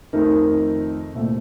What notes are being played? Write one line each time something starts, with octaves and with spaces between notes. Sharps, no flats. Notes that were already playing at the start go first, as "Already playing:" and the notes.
F2 D#3 A3 D#4 A#4
C2 A#2 A3 C4